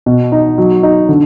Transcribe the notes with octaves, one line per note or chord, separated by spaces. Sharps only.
B2
D#4
F#3
D#4
D3